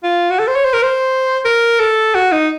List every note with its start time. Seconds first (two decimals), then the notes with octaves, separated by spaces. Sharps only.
0.03 F4
0.31 F#4
0.39 A4
0.48 C5
0.55 C#5
0.65 C5
0.73 A#4
0.83 C5
1.45 A#4
1.80 A4
2.15 F#4
2.32 D#4